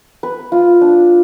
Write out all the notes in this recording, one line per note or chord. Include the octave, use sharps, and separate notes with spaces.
B4
F4
D4